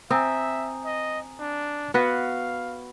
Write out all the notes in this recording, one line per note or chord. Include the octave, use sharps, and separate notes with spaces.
C4 E5 G#5 A#5 D#6
D#5
D4
B3 F#4 B4 F5